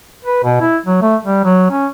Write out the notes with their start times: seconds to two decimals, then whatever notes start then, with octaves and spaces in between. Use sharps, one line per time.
0.25 B4
0.44 B2
0.61 E4
0.86 F#3
1.02 A3
1.25 G3
1.45 F#3
1.71 C#4